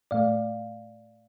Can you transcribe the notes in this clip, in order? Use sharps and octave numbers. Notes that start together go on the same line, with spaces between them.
A2 A3 D5 F5